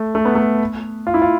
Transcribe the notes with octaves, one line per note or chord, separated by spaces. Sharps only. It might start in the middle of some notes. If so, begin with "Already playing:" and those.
Already playing: A3
A3
B3
A3
F4
E4
F4